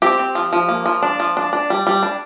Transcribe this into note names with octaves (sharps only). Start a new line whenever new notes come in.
C4 G4
C4
F3
F3
A#3
F3
D4
F3
D4
D4
G3
G3
D4